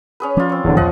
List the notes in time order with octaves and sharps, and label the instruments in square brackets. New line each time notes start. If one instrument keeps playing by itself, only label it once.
[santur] C#4 G#4 B4
[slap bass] F3 C#4 [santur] F4 D5
[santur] C4 C#5
[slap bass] D1 G2 [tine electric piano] E2 D3
[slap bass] A1 E2 G#2 [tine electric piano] F3 [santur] D#5 F#5 G#5